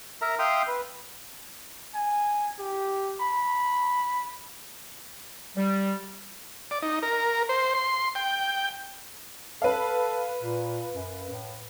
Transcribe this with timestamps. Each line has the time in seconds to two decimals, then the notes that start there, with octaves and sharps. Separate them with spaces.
0.22 A#4 E5 A#5
0.39 E5 F5 G5 C6 D#6
0.67 B4
1.95 G#5
2.59 G4
3.21 B5
5.56 G3
6.71 D5
6.82 D#4
7.02 A#4
7.49 C5
7.75 C6
8.15 G5
9.62 A4 B4 F5
10.43 A#2
10.94 F#2
11.30 A2